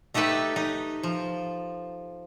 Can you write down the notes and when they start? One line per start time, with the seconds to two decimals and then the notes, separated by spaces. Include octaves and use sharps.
0.14 A3 D#4 G4 A4 B4
0.56 D#4
1.03 F3